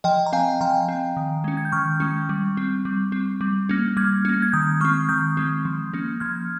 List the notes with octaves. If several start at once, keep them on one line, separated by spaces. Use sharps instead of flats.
F3 D#5 G5
A#5
C4 F5 G#5
F3 G5 A#5
C4
D#3
G#3 C#4
G#6
G6
D#3 C#6 F6
G#3 C#4
G3
C4
G3
C4
G3
A#3 C#4
G3 F6 G#6
A#3 C#4
G#6
D#3 D#6 G6
G#3 C4 C#6 F6
D#3 D#6 G6
G#3 C4
F3
A#3 C#4
F3 F6 G#6